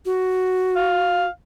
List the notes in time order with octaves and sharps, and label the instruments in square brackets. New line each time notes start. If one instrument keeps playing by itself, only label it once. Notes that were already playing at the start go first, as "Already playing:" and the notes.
[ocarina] F#4
[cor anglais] F5